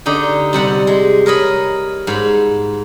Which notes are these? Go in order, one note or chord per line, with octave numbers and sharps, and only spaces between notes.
D3 D#4 G4
C3 G3 F#5
G#3
A#4 C#5 D#5 B5
G#2 B5